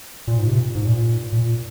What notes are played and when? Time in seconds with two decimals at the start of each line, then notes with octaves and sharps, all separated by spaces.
0.28 A#2
0.38 G#2
0.47 C3
0.54 A#2
0.75 G#2
0.85 A#2
1.32 A#2